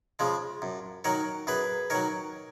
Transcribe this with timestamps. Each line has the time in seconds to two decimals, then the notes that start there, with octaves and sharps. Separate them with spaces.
0.19 C#3 F3 G#3
0.62 F#2
1.04 D#3 F#3 A#4 C#5
1.47 F#2 G#4 B4
1.90 D#3 F#3 A#4 C#5